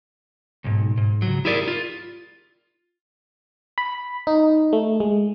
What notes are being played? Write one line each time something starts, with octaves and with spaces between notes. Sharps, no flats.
B1 G#2
G#2
C#2 F#3
E4 G4 G#4 A#4 D5
F4
B5
D#4
A3
G#3